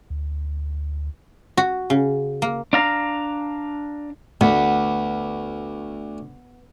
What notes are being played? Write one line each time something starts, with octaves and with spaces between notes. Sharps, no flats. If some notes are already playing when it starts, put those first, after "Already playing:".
D2
F#4
C#3
A#3
D4 F5 A#5
D2 B3